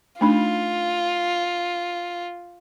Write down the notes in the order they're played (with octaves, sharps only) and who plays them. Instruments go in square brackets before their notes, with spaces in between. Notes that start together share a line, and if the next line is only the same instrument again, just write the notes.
[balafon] A3 D4 D#4 [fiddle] F4